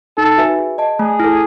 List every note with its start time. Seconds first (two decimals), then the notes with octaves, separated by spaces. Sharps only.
0.17 D#4 A4
0.37 F#4 B4 E5 G#5
0.59 G#4
0.78 D#5 A5
0.99 A3 G#4
1.20 E4 A4